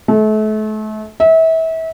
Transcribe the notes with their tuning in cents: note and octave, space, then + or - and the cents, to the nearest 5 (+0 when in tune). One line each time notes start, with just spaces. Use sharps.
A3 -35
E5 -30